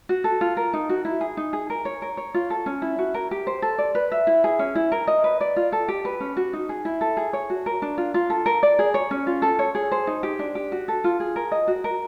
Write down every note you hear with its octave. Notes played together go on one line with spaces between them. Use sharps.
F#4
A4
F4
A#4
D#4
F#4
E4
G#4
D#4
G#4
A#4
C#5
A#4
C#5
F4
A4
C#4
E4
F#4
A#4
G4
C5
A4
D5
B4
E5
E4
G#4
C#4
E4
A#4
D#5
B4
D5
F4
A4
G4
B4
C#4
F#4
D#4
G#4
E4
A4
G#4
C#5
F#4
A#4
D4
F4
F4
A4
A#4
D5
G#4
C#5
C#4
F4
A4
C#5
G#4
C5
D#4
G4
D4
G4
F#4
A4
F4
G#4
A#4
D#5
F#4
A#4